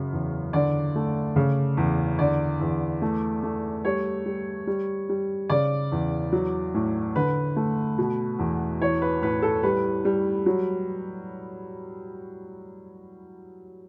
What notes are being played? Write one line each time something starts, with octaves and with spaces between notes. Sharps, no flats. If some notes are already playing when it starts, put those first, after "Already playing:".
Already playing: F#2 C#3
E2
D3 D5
A3
C#3
E2
D3 D5
E2
A3
A3
G3 C#5
G3
G3
G3
C#3 D5
E2
F#3
A2
D3 B4
A3
B2
E2
E3 C#5
B4
A2 B4
A4
G3 B4
G3
F#3